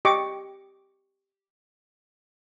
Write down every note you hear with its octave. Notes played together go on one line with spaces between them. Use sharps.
G4 D#5 C#6 D6